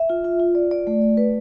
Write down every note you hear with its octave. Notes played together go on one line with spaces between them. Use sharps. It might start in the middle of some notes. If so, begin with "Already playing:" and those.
Already playing: E5
F4
F4
F4
D5
D5
A3
D5
B4